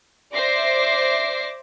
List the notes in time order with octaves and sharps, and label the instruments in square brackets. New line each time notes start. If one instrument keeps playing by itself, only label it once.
[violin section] C5 D5 E5 D6 A#6 C7